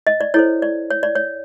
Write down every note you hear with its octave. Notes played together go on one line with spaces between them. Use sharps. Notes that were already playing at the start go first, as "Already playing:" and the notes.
D#5
D5
E4 A4 C5 C#5
D5
C#5
D5
C#5